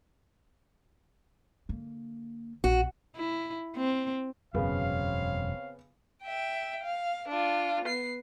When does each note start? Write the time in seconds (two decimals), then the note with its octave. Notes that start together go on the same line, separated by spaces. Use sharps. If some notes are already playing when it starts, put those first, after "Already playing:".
1.69 D3 A#3
2.64 A#1 F#4
3.16 E4
3.76 C4
4.54 E1 F#2 C#3 B3 C4 C#5 F5
6.24 E5 G5
6.83 F5
7.29 D4 F4
7.85 B3 C7